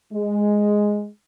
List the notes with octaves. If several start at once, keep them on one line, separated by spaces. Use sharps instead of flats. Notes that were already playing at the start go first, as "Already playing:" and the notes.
G#3